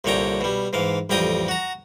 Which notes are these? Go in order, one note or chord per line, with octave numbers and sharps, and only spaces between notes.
C2 A#2 D3 C#5 G5 A#5
B2 G3
G#2 E3 F5
A1 F2 G3 G5 A#5 D#6
F#4 A#5